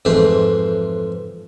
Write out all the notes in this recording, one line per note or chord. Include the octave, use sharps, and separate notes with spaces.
F2 G#2 E3 A3 C5 C6